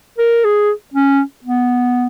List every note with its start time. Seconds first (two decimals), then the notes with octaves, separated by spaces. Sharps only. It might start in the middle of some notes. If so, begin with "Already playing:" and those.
0.18 A#4
0.44 G#4
0.94 C#4
1.44 B3